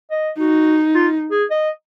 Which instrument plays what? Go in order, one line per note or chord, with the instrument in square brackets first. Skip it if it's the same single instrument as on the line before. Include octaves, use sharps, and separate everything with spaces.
[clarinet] D#5
[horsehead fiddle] D#4 [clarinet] F#4
[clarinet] F4
G#4
D#5